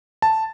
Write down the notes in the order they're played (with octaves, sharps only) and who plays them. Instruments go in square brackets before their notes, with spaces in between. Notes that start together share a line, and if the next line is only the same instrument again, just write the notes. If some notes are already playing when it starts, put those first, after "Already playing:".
[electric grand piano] A5